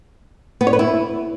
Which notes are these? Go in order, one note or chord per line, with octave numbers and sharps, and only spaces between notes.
B3
C#5
B4
E4